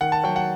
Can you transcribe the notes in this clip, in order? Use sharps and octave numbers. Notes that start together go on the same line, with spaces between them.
D#3 F#5
A5
F#3 G5
F#5